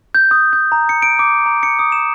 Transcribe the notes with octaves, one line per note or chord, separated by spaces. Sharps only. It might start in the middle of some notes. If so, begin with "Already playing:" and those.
G6
D#6
G6
A#5
C#7
D7
D6
A#5
C#7
D#6
E7